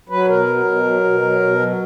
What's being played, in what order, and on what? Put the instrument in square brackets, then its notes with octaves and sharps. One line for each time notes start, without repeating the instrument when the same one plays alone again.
[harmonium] F#3 B4
B2 A#4
F#3
B2
F#3
B2
F#3
B2
F#3